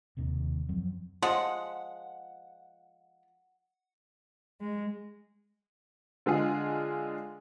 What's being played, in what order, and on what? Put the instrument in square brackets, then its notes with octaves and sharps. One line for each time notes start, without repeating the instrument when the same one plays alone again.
[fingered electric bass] E1 D#2 C3 D#3
F#2 F3 F#3 C4
[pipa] F3 G#3 [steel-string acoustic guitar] F#5
[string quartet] G#3
[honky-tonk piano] D3 G#3 F4 G#4